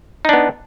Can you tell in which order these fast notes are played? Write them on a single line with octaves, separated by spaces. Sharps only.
D#4 D4 B3